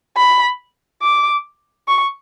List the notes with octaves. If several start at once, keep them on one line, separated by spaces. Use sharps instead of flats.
B5
D6
C#6